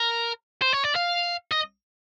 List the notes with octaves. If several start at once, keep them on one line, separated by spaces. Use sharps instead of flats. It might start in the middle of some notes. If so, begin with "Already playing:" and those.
Already playing: A#4
C5
C#5
D5
F5
D#5